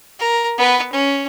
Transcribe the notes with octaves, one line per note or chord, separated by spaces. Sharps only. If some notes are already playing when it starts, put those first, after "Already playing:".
A#4
B3 B4
C#4